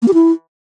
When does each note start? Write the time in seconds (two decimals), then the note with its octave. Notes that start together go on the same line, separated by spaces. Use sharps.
0.02 A#3
0.08 G4
0.14 E4